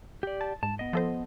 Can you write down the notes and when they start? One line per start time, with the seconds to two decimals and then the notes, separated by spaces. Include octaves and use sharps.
0.23 G4 D5
0.41 A5
0.63 G#2 A5
0.79 B3 D#5
0.93 F3 A4 C5